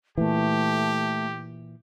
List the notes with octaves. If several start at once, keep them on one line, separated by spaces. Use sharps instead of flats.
A#2 E3 A3 G4